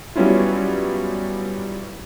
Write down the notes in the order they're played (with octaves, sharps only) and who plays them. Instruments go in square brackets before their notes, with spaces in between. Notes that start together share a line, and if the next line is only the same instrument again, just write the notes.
[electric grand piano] F#3 G3 B3 C#4 E4 F4